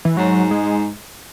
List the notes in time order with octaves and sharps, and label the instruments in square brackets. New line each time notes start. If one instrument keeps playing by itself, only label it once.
[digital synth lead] E3
[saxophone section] G#2 [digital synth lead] F#3
[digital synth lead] G#3